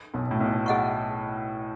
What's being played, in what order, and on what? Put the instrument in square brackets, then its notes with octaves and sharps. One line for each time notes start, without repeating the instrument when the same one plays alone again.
[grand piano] B1 B2
A2
B1 B2
[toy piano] G#4 D#5 F#5 C#6